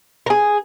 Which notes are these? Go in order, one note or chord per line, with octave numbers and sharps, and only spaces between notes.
A#4
G#4